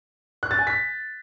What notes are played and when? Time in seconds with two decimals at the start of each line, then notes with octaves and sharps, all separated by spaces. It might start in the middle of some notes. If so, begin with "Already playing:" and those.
0.43 F#6
0.51 A6
0.59 G#5
0.67 B6